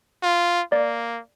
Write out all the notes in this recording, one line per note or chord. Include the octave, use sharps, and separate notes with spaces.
F4
A#3 D5